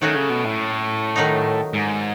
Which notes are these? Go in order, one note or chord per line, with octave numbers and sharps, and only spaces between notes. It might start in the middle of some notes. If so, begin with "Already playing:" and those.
D#3 F#3 A3 C#4 F#4
C#3
B2
A2
D#3 F#3 A3 D#4
G#2